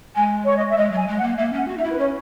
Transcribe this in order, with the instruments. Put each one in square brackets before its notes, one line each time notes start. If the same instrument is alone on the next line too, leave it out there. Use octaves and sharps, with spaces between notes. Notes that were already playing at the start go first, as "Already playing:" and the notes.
[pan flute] G#3 [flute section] G#5
[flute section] C#5
D#5
E5
[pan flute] G#3 [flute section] D#5
[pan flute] F#3 [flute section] G#5
[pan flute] G#3
[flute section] F#5
[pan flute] A#3
[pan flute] A#3 [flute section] E5
[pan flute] C#4
[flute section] F#5
[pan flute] F#4
[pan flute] D#4 [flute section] E5
[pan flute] E4
[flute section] B4
[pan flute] C#4 [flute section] C#5